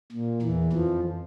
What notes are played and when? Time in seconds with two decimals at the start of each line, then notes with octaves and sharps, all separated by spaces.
0.12 A#2
0.42 E2 E3
0.72 F2 F3